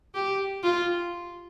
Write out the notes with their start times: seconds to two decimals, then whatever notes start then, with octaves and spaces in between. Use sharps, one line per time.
0.15 G4
0.63 F4